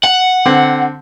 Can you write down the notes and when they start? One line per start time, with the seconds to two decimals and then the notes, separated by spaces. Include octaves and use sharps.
0.04 F#5
0.45 D3 C4